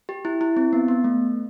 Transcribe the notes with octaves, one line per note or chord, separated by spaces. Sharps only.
G4
E4
E4
C4
B3
B3
A3